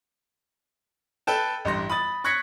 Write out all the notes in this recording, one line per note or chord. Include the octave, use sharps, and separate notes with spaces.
A4 B4 G5 A5
A1 G2 C6 A#6
B5 D#6 A6
C#6 F#6 G#6 A#6 B6 C#7